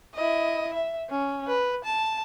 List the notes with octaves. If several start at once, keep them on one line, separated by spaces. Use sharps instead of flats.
E4 D#5
E5
C#4
B4
A5